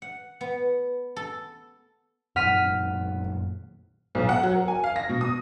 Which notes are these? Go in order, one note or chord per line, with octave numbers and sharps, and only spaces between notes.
F#5
B3
A4
F#2 A#2 D#3 F#5 F6 B6 D#7
B1
F#5
F#3
A#4
G#5
F5
A#6
B2
D#6